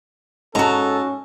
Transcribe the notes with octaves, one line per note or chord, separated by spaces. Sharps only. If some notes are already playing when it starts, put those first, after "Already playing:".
G#2 C#4 F#4 A4 A#5